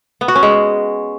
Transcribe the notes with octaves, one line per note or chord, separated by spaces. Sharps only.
B3
F#4
C#4
G#3